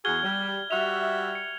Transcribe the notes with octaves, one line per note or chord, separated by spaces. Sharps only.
E2 F#4 G#4 F6 G#6 G7
G3
G3 F#4 E5 F7
C#7